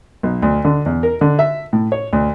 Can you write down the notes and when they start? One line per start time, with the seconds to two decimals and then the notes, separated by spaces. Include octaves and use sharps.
0.23 B1
0.42 D2
0.65 D3
0.86 E2
1.03 A#4
1.21 D3
1.39 E5
1.73 A2
1.92 C#5
2.13 D2